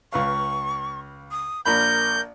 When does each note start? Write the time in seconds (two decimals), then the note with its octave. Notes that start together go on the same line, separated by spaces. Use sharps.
0.13 C#2 B4 F5 C#6
1.31 D#6
1.66 A#1 A#3 A#4 B5 G6